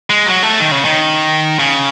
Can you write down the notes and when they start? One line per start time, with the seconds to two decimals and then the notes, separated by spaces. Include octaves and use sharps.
0.10 G#3
0.27 F#3
0.43 A3
0.60 D#3
0.71 C#3
0.85 D#3
1.59 C#3